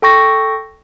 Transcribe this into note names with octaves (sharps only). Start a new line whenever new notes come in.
A4 G5 C#6 A#6